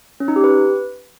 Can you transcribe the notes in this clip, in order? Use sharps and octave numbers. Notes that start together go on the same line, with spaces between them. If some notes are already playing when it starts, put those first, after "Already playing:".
C#4
D#4
G4
B4